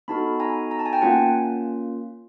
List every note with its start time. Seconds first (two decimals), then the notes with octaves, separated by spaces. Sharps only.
0.08 B3 D#4 F#4 A4 A5 B5
0.40 G#5 A#5
0.71 A#5
0.79 A5
0.86 G#5
0.93 G5 A5
1.02 A#3 C#4 F4 F#5 G#5